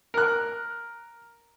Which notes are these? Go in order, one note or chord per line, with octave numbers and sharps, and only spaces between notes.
A#4 F#6